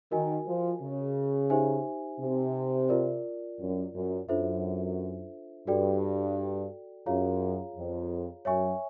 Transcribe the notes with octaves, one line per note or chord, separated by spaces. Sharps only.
D#3 F#4 A#4 D#5 G#5
F3
C#3
D#4 G4 C5 E5 G#5
C3
F4 A#4 D5
F#2
F#2
F#2 D4 F4 A4 C5 E5
G2 F#4 A4 D5 G5
F#2 F4 G#4 C#5 F5 A#5
F2
F#2 C#5 E5 G#5 C#6